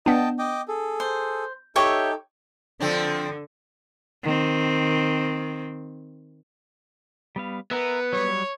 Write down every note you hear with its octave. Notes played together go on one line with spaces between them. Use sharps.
B3 D4 D#5 G5 A5
D#5 G5 D6
G#4 A4
C5
D#4 G4 A4 C#5 E5
D3 F3 C4 D4
D#3 C4
G3 B3 F5
B3 A#4 E5
F#3 G3 C#5